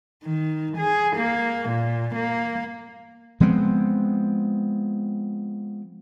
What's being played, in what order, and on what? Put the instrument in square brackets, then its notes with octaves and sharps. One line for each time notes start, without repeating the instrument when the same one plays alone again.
[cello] D#3
G#4
A#3
A#2
A#3
[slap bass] F3 G#3 B3 C4